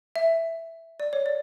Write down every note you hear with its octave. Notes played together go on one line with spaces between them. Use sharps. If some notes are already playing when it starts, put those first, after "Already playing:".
E5
D5
C#5
D5